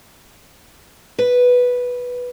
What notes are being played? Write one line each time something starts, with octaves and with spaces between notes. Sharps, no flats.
B4